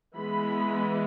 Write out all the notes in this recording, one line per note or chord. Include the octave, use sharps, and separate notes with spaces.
E3 G#3 B3 B5